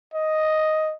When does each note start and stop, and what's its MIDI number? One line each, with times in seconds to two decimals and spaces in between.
0.14 0.94 75